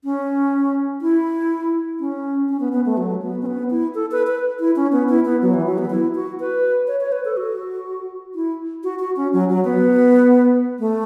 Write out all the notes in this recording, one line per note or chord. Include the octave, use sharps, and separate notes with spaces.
C#4
E4
C#4
C#4
B3
B3
A3
F#3
B3
C#4
B3
E4
A4
B4
B4
E4
C#4
B3
E4
B3
F#3
E3
F#3
B3
E4
F#4
B4
C#5
C#5
B4
A4
F#4
E4
F#4
F#4
C#4
F#3
F#3
B3
A3